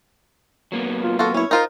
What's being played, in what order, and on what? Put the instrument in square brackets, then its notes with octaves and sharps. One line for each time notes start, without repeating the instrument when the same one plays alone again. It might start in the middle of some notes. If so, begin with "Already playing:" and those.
[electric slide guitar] F#3 A#3 B3
[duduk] F4
[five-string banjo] F4 F#4 [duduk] A4
[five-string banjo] C#4 C#5 [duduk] E4
[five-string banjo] D#4 F4 C5 [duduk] A#4